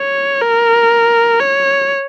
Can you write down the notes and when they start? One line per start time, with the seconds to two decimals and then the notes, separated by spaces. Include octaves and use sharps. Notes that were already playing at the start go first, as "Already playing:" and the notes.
Already playing: C#5
0.41 A#4
1.40 C#5